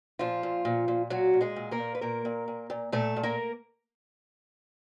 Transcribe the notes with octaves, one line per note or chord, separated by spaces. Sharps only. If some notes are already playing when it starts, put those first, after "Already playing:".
A#2 F3 F4
A#2
A#2
A#2
A#2 F#3 F#4
A#2
G#3 G#4
A#2
A#3 A#4
A#2
B4
A#2 A#3 A#4
A#2
A#2
A#2
A#2 A3 A4
A#2
A#3 A#4